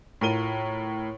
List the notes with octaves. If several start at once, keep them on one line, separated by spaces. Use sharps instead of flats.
A2 F4 A#4 D#7 G7